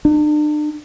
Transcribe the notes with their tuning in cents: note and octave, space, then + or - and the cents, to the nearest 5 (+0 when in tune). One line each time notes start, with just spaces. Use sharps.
D4 +40